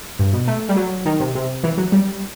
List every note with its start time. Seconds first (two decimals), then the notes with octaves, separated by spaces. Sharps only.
0.19 G2
0.33 B2
0.48 A3
0.69 G3
0.76 F#3
1.05 D#3
1.20 C3
1.35 C3
1.64 E3
1.78 F#3
1.92 G3